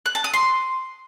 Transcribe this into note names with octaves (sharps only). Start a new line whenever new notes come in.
F#6
A5
D#6
C6